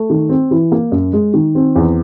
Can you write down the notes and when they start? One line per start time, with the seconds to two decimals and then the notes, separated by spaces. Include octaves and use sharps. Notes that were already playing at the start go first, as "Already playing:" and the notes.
Already playing: A3
0.10 D#3
0.29 C4
0.51 E3
0.72 A#3
0.92 F#2
1.13 G#3
1.34 D#3
1.55 C4
1.76 E2